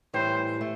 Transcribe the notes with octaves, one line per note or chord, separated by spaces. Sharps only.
A2 E3 G3 C5
A3